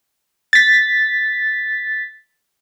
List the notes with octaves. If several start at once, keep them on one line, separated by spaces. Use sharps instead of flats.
A6 B6